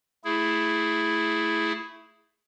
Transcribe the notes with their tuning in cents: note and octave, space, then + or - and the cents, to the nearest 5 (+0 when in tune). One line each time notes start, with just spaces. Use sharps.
A3 +5 E4 +0 G#4 +10